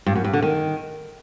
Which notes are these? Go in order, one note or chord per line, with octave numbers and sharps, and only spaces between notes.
G2
F#2
G2
D3
D#3